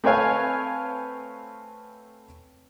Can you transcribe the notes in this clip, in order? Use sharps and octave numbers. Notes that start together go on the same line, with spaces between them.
A3 C4 B4 C#5 F5 G#5